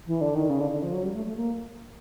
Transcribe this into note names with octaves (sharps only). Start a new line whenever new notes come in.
E3
D3
D#3
C#3
D3
D3
F3
F#3
G3
A3
A3
A#3